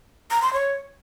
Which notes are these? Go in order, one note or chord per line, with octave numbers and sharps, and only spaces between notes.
A#5
C6
C#5